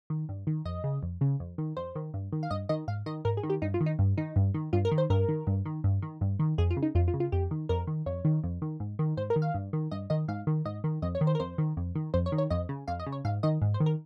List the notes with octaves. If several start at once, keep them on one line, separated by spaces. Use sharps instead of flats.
D#3
G2
D#3
F2 D#5
C#3
F2
C#3
F2
D#3
F2 C5
D#3
G2
D#3
F5
G2 D#5
D#3 D#5
G#2 F5
D#3 D#5
G#2 A#4
G#4
D#3
G4
G2 D#4
F4
D#3
D#4
G2
D#3 D#4
G2
D#3
G2 F4
A#4
D#3
C5
G2 A#4
D#3
G2
D#3
G2
D#3
G2
D#3
F2 G#4
F4
C#3
D#4
F2 F4
F4
C#3
F4
F2 G4
D#3
F2 A#4
D#3
F2 C#5
D#3
F2
D#3
G#2
D#3
G#2 C5
A#4
D#3
F5
G2
D#3
G2 D#5
D#3 D#5
G#2 F5
D#3
G#2 D#5
D#3
F2 D#5
C#5
D#3
C5
A#4
F2 C5
D#3
F2
D#3
F2 C5
C#5
D#3
C#5
F2 D#5
C#3
F2 F5
D#5
C#3
C#5
G#2 F5
D#3 D#5
G#2
C5
D#3
A#4